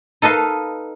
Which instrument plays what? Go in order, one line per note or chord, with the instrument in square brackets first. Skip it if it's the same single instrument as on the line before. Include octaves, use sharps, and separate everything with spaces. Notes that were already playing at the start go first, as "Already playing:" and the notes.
[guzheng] D#4 A4 B4 D#5 F5